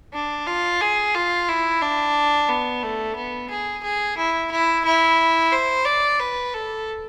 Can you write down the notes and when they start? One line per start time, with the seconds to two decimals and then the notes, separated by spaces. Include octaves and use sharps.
0.13 D4
0.47 F4
0.81 G#4
1.15 F4
1.49 E4
1.81 D4
2.49 B3
2.83 A3
3.16 B3
3.50 G#4
3.83 G#4
4.17 E4
4.51 E4
4.85 E4
5.52 C5
5.85 D5
6.19 B4
6.54 A4